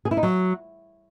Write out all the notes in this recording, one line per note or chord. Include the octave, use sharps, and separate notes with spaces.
G#4
E4
D#4
F#3